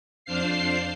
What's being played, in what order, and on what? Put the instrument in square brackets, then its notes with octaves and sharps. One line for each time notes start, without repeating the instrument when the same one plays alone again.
[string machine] F2 D4 C5 F5 C7